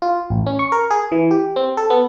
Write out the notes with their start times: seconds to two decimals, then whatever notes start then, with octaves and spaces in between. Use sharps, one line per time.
0.02 F4
0.30 A1
0.46 C#4
0.59 C#6
0.72 A#4
0.90 G#4
1.12 E3
1.31 G4
1.56 C4
1.77 A4
1.90 B3